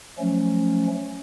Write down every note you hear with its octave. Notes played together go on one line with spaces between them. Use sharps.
F3 F#3 A3 C#4